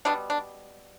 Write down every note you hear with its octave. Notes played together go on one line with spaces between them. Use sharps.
B2 G3 B3 D4
D4